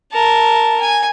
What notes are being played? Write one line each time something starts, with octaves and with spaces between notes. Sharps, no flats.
A#4 A5
G#5